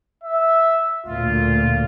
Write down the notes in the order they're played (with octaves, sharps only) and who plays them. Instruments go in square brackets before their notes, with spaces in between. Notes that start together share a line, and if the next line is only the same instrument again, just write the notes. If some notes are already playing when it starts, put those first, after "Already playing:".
[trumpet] E5
[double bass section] D2 A#2 [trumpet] F4